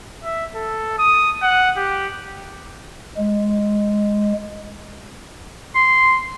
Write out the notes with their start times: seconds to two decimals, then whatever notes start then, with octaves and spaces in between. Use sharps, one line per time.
0.24 E5
0.55 A4
0.99 D#6
1.42 F#5
1.77 G4
3.17 G#3
5.75 C6